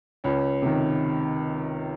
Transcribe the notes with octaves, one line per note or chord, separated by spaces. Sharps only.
C#2 C#4
C3 D#3